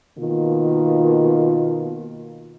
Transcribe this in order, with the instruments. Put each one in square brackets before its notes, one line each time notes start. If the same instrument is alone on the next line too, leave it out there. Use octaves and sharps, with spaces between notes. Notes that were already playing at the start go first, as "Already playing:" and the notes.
[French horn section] B2 D#3 A#3 F4